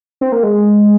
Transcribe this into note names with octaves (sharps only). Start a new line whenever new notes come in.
C4
A#3
G#3